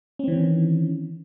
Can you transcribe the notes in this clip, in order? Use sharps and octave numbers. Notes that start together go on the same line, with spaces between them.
D#3 E3 C4 C#4